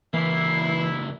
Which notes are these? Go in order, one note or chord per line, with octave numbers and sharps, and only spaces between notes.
C#2 E3 A#3 E4 C7